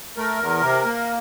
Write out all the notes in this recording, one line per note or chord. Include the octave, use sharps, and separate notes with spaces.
A3 A#4
E2
C3
A#3